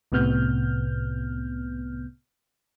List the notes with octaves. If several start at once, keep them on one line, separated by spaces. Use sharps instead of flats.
C2 A2 C3 B3 F6 G6